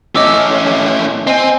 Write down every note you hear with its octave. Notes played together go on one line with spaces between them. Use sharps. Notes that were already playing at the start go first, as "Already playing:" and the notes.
A2 C#4 D#5 D6 E6
C4 D#5 G#5